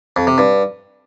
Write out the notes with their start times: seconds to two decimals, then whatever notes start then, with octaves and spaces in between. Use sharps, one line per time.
0.16 F2
0.27 C3
0.38 G2